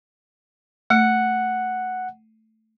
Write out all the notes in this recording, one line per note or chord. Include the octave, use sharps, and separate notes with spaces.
A3 F#5